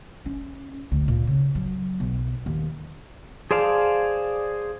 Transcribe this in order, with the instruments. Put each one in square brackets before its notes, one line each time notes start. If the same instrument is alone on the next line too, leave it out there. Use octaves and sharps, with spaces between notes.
[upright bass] C#4
D2
A#2
C#3
F#3
B1
D#2
[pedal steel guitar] G#4 C5 D5 F5 A5